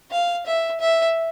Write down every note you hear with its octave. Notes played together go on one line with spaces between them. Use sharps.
F5
E5
E5